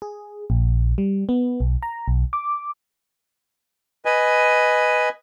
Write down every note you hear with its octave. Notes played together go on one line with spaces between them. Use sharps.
G#4
A#1
G3
B3
B1
A#5
B1
D6
B4 D#5 G#5